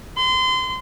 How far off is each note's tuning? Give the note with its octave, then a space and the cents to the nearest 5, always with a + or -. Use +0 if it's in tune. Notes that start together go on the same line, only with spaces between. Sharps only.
C6 -30